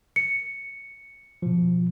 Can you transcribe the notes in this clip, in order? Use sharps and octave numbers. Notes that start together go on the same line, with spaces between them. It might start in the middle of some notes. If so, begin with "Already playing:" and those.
C#7
B2 F3